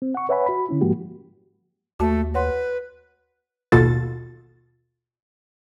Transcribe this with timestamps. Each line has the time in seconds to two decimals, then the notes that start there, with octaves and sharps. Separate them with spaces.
0.02 C4
0.15 F#5 C#6
0.29 B4 C#5 E5 F#5 G#5 B5
0.46 F#4 B5
0.69 D3 C#4 E4
0.81 G#2 F3 G#3 A#3 F#4 G4
2.00 D#2 A3 F#4 A5
2.34 B4 C#5 F#5 C6
3.72 A1 D#2 B2 F4 A4 A6